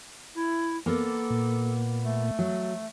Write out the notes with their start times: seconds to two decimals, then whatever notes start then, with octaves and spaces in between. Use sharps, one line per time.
0.34 E4
0.86 A#3 B3 A4 D5
1.30 A#2
2.03 A3
2.39 F#3